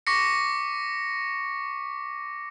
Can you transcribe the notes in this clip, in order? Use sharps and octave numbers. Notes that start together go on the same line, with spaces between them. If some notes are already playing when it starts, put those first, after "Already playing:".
C#6 D6 A#6 B6 C#7